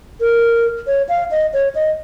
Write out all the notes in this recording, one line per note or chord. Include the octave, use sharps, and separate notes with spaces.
A#4
C#5
F5
D#5
C#5
D#5